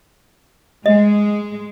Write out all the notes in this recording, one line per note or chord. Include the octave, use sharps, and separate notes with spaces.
G#3 D#5